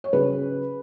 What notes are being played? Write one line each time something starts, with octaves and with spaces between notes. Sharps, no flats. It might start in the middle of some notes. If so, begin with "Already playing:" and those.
C#5
C#3 F#3 G#4 B4